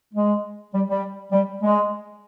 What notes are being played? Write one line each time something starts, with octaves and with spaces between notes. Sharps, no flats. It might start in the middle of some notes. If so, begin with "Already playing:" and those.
G#3
G3
G3
G3
G#3